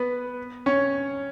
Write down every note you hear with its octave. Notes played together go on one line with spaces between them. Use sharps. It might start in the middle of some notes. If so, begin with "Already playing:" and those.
Already playing: B3 B4
C#4 C#5